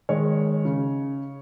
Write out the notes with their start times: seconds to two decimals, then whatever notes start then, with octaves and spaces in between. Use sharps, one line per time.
0.09 D#3 G#3 C#5
0.65 C#3